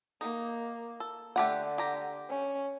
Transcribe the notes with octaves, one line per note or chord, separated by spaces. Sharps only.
A#3 D#4
A4
D3 A3 G4 F#5
G4 A#5
C#4